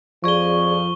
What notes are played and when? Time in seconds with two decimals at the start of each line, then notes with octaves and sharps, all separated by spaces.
0.24 F2 F3 G#4 D5 C#6 G7